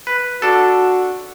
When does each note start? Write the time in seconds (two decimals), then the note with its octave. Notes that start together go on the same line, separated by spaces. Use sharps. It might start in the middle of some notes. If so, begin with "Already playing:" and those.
0.07 B4
0.42 D4 F#4 A4